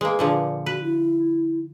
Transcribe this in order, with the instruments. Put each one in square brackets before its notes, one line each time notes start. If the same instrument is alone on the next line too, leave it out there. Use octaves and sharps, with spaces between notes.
[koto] G#3 A#3 [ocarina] B4
[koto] A#2 D3 F3
[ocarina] F#4 [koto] B4
[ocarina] E4